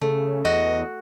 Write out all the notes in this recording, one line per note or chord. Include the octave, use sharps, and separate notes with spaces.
C#3 A3
E2 F#4 D#5